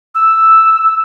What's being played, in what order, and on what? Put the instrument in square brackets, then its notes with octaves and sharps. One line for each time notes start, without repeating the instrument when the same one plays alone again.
[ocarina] E6